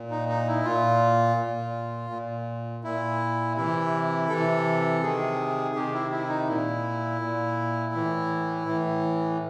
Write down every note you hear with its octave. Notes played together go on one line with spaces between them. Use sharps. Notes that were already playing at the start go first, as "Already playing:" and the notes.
Already playing: A#2
D#4
D#4
E4
A#2 F4
A#2
A#2
A#2 E4
C3 E3 E4
C3 E3 A4
C3 D#3 G#4
C3 D#3 G4
E4
E4
D#4
A#2 E4
A#2
A2 E3
A2 E3